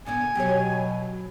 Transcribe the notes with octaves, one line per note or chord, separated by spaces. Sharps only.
A#2 D3 B3 D5 G#5
B2 F#3 G4 C#5